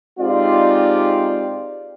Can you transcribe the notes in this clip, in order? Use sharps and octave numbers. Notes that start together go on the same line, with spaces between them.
G#3 C4 D#4 F4 G4 D5